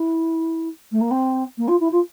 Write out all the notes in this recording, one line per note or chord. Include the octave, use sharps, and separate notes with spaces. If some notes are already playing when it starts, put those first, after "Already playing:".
Already playing: E4
A3
A#3
C4
A#3
F4
E4
F4